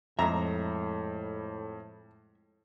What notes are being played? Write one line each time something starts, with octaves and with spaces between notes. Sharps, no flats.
F2 A2 G#3 E5 A#5